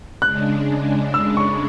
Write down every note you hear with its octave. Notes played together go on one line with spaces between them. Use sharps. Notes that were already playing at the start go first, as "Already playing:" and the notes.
C#3 G#3 D4 F#6
E6
C#6